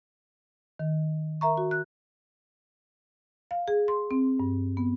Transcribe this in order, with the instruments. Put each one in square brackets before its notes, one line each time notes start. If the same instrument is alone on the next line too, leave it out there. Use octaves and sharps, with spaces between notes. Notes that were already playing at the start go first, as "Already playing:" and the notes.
[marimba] D#3
A#4 E5 A#5 C#6
F#4
F#6
F5
G#4
C6
C4
G2
B3